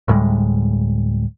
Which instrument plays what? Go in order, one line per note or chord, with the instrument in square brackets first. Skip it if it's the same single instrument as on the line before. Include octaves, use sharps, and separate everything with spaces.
[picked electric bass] D2 A2 G3 G#3